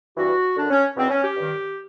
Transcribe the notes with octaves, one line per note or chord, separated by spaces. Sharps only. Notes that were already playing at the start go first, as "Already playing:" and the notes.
G2 E3 F#4
F#2 D3 D4
C#4
E2 B2 C4
C#4
G4
G2 D#3